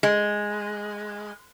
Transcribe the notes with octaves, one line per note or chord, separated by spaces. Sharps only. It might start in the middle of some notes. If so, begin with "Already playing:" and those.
G#3